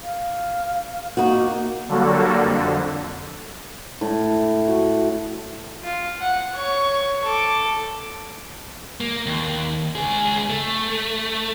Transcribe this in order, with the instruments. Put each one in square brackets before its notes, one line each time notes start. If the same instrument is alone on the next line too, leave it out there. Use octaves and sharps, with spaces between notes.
[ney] F5
[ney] A#3 [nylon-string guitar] D#4 F#4
[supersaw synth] D3 F#3 G3 A#3 F#4 A4
F2 D3
[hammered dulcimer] A2
F#4
[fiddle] F4
F#5
C#5 C#6
A4 D6
[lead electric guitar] A#3
D#2
C#2 G#4
A3